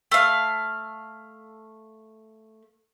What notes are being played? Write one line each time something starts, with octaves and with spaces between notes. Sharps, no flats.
A3 F5